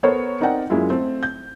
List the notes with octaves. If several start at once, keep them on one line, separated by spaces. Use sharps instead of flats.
B3 A4 A#4 C5 C#5
C4 D#4 A#4 D5 F#5 G5
F#2 G#3 A#3 E4 F4
A3 C4 A4
G6